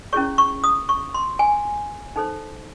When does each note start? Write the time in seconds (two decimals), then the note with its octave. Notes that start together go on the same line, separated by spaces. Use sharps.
0.13 C#4 E4 G#4 C#5 C#6
0.38 C#6
0.64 D#6
0.89 C#6
1.14 C6
1.39 G#5
2.16 D#4 A4 C5